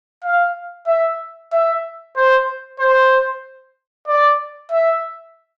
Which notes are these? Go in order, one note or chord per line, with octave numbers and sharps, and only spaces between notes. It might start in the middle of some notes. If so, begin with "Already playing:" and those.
F5
E5
E5
C5
C5
D5
E5